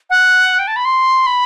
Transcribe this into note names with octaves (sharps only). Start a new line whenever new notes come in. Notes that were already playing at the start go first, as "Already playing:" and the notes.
F#5
G5
A5
B5
C6
B5